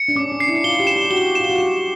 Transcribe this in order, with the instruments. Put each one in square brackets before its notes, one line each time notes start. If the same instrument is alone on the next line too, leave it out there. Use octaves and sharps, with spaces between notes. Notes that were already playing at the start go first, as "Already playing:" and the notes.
Already playing: [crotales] C#7
[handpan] D4
[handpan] C#4 [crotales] D6
[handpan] D4
[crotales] C7
[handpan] E4
[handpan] F4 [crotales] G7
[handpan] G4
[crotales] E7
[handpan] G4
[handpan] F#4 [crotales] G7
[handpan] F4 [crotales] E7
[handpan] F#4
[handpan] G4 [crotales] E7